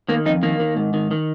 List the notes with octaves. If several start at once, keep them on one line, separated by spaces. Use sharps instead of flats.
D#3 A#3
F2 D#4
D#3 A#3
D#3
G#2
D#3
D#3